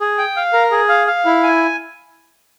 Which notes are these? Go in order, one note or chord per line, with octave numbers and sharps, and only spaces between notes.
G#4
G5
F5
A#4
G#4
F5
F5
E4
G#5